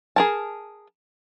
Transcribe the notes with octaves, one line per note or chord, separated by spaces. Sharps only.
G#4 A#4 A5